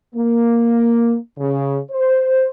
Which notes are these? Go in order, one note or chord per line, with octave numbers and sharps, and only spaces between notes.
A#3
C#3
C5